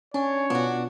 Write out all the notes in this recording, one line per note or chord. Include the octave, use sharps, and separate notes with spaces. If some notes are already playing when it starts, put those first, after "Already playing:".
C#4 D4 C#5
B2 B3 D4 F4 F#4